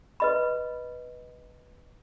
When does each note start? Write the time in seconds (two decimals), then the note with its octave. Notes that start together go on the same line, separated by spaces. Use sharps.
0.20 B4 D#5 B5